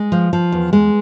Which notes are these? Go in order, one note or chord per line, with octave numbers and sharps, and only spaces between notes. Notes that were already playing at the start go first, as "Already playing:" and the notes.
Already playing: G#3
F3
F3
E2
G#3